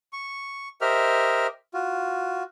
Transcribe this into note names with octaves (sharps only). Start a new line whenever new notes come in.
C#6
G4 A#4 C5 D#5 E5 F6
F4 F#4